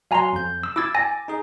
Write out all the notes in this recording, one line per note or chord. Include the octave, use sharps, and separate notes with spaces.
F#3 F5 G#5 A#5 C6
F2 G6
E6
E4 D6 E6 G#6 A6
G#5 A#6
D#4 G#4